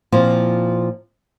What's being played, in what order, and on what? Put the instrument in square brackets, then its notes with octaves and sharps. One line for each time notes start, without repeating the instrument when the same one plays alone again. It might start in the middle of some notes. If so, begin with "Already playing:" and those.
[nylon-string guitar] A#2 F3 C4 E4 F4